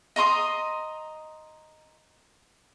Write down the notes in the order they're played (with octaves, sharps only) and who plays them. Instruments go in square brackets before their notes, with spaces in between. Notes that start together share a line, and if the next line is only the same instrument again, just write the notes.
[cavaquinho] D#5 A#5 C6 D#6